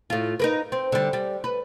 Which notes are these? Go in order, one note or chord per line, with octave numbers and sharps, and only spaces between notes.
A2 F4
D#4 A#4 B4
C4
D3 G3
G3
B4